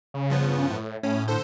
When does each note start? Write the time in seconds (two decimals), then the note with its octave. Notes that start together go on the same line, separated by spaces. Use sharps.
0.14 C#3
0.30 G2 F3 B3
0.70 A2
1.03 A2 C#4
1.28 D3 A4 C5